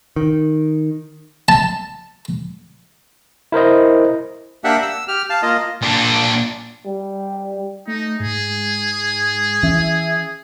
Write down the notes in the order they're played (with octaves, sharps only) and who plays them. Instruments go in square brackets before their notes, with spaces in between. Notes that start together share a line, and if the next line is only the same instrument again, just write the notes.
[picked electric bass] D#3
[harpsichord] A5
[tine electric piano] E4 A#4 C5 D#5
[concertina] A#3 D4 G4 E5 F#5
E6
G4 F6
F5 A5
A#3 F4 D#5
[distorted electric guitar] A#2 D4
[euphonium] G3
[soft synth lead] A3 [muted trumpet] D#4
[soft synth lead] G#2 [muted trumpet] G#4
[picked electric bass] E3 C#4 [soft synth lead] E5